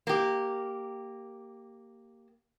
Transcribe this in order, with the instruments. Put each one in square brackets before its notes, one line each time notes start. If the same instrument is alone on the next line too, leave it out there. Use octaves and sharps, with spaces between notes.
[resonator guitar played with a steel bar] A#3 G4